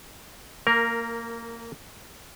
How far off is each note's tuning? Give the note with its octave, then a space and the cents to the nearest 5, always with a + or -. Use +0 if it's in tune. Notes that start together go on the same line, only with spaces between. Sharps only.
A#3 -20 A#4 +0